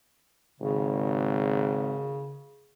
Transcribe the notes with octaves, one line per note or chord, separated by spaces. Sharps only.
G#1 C#3